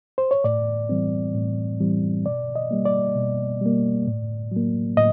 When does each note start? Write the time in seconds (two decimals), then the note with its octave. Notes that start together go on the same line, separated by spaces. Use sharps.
0.18 C5
0.31 C#5
0.44 A2 D5
0.89 E3 G3 C4
1.35 A2
1.80 E3 G3 C4
2.26 B2 D5
2.56 D#5
2.71 G3 A#3
2.85 D5
3.16 B2
3.61 G3 A#3
4.07 A2
4.52 F#3 A#3
4.97 A2 D#5